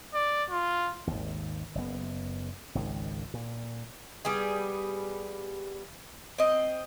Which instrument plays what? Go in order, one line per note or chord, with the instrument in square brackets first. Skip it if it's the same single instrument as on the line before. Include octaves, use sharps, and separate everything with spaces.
[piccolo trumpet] D5
F4
[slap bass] G#1 D#2
F#1 B3
G#1 C#2 D#3
A#2
[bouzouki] G3 B3 G#4
C4 D#5